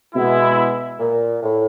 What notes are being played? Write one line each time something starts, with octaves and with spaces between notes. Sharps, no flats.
B2 G#3 B3 E4
A#2
A2